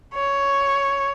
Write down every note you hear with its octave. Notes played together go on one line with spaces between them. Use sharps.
C#5